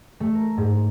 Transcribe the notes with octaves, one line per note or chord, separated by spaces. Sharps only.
A3
A#4
G#2